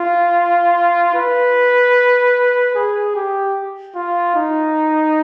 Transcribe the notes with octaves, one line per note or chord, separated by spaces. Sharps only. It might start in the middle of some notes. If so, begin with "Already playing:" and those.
Already playing: F4
B4
G#4
G4
F4
D#4